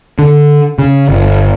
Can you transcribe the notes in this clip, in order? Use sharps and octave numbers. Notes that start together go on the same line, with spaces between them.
D3
C#3
G1